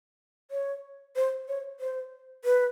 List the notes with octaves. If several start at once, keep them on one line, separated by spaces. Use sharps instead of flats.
C#5
C5
C#5
C5
B4